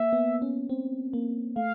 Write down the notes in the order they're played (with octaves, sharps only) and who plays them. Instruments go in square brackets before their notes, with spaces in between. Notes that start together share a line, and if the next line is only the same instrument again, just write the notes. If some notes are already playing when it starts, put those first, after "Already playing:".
Already playing: [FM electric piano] A#3 [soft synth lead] E5
[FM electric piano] B3
C#4
C4
A#3
[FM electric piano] A3 [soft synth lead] F5